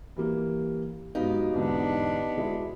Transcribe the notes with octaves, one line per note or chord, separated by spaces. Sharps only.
E3 G3 A#3
G#2 F#3 B3 D#4 G4 F5
E2 G#2 D3 B3 D4
B2 G#3 E4